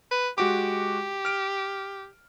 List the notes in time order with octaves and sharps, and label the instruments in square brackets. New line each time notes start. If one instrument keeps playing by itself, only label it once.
[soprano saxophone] B4
[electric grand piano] G#3 F#4 D6 [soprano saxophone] G4
[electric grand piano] F6 D7